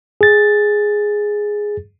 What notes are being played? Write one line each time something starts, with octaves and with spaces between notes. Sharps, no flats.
G#4 A6